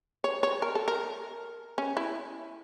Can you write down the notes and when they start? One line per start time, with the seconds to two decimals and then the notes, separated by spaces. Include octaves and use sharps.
0.24 C#5
0.43 C#5
0.62 A#4
0.75 A4
0.88 A#4
1.78 C#4
1.97 E4